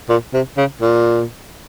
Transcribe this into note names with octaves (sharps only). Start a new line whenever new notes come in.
A#2
C3
C#3
A#2